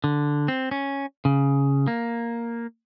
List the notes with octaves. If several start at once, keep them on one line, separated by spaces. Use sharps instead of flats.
D3
C4
C#4
C#3
A#3